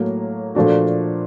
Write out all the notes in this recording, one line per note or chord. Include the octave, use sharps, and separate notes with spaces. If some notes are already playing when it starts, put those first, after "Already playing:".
Already playing: A2 F#3 A#3
A#2 F3 A3 D4 F#4